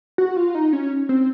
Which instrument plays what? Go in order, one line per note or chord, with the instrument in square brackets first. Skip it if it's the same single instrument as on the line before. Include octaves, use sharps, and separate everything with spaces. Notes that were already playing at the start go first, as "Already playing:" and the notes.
[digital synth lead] F#4
F4
D#4
C#4
C4